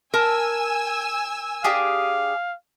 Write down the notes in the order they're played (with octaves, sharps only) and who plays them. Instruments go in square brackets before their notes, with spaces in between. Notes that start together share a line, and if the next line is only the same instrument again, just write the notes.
[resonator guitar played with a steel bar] A#4 A5 [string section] G#5 E6
[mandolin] D4 G4 G#4 [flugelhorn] F5